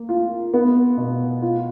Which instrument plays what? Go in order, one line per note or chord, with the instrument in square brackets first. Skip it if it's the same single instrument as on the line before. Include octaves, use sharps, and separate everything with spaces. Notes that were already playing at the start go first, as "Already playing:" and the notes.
Already playing: [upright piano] A#3
F4
B3
B2
F4